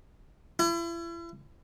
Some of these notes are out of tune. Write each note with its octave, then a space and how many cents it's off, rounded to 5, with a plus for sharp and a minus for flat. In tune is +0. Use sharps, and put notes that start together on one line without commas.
E4 +40